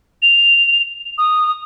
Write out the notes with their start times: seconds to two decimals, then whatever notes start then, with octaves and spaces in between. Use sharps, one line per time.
0.22 F7
1.18 D#6